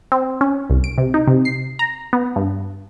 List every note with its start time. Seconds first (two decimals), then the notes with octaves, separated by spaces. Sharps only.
0.12 C4
0.41 C#4
0.70 C2
0.84 D7
0.98 C3
1.14 D#4
1.27 C3
1.45 C7
1.79 A#5
2.13 B3
2.36 G2